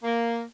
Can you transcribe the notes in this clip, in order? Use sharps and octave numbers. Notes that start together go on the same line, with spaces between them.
A#3